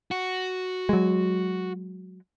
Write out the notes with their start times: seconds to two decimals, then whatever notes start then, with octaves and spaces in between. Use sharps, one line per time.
0.11 F#4
0.89 F#3 G#3